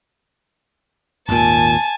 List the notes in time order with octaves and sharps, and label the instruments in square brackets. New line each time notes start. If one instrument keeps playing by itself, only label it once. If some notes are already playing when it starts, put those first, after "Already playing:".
[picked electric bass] G#1 D#2 A#2 [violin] G#5 A5